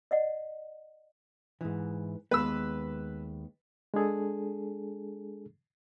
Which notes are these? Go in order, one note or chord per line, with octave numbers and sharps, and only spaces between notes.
D5 D#5 F#5
G#2 E3
D#2 G#3 B3 B4 E6
G#3 D4 G#4 A4